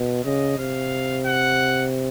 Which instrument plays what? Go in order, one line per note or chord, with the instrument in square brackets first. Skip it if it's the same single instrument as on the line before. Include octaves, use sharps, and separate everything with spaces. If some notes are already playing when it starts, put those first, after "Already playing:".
Already playing: [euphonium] B2
[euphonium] C#3 [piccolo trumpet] D#5
[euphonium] C3 [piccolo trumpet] F5
[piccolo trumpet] F#5